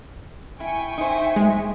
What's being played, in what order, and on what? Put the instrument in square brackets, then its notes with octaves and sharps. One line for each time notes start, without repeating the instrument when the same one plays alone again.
[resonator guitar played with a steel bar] E4 [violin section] G5 G#5 C#6
[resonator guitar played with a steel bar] D#4 C5 [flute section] E5
[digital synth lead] G#3